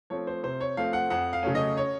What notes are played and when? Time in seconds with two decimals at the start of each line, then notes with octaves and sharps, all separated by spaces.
0.10 F3 A3 C4 C#5
0.27 C5
0.43 C3 C5
0.61 C#5
0.77 F3 A3 C4 F5
0.93 F#5
1.10 F2 F#5
1.33 F5
1.43 C#3 F#3 A3 C#4
1.55 D#5
1.77 C#5